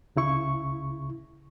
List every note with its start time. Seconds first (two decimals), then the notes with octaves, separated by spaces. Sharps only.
0.16 C#2 C#3 E4 C#6